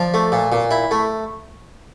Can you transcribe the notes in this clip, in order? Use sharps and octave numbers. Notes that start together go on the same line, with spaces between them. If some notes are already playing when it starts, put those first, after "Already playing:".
Already playing: F3 D5
A3
A#2
A#2
E4
A3